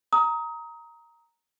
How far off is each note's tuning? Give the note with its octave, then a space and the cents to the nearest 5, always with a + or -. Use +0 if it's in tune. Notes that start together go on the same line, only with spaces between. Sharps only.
A#5 +0 D#6 +25